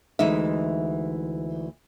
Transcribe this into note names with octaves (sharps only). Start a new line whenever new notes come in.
D2 E3 G#3 D#4 E5